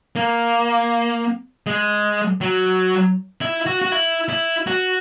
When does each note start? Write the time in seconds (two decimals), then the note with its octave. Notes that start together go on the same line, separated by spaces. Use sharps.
0.16 A#3
1.67 G#3
2.41 F#3
3.41 E4
3.66 F#4
3.82 F#4
3.92 E4
4.29 E4
4.67 F#4